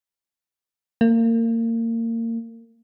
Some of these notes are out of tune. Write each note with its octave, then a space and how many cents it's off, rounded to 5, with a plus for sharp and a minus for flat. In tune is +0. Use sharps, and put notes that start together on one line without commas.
A#3 -30